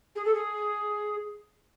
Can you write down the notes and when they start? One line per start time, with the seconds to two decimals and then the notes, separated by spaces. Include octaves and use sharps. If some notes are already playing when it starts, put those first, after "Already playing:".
0.16 G#4
0.25 A4
0.35 G#4